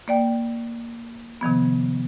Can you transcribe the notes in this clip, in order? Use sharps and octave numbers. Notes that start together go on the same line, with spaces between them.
A#3 D5 G5
C3 D#3 F3 B3